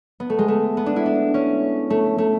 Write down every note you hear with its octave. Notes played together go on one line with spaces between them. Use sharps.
B3
A3
G#3
A3
B3
D4
E4
D4
C#4
A3
A3